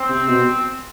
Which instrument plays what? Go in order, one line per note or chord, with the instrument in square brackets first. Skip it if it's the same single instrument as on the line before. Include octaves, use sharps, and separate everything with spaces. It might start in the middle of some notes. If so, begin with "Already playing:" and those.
Already playing: [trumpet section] C4
[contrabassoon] C3
B2